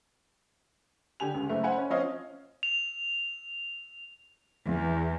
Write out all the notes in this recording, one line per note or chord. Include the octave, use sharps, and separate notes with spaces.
D3 G4 G#5 F7
C#2
F#1 A3
C5 F#5 G#5 B5
C#4
F3 C4 C#4 C#5 D#5 F5
F7
E2